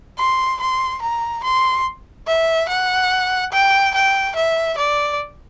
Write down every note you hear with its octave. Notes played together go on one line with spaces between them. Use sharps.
C6
C6
A#5
C6
E5
F#5
G5
G5
E5
D5